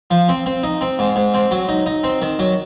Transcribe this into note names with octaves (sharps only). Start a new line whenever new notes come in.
F3
C4
C4
D#4
C4
G#2
G#2
C4
F#3
D#4
D#4
C4
D#3
F#3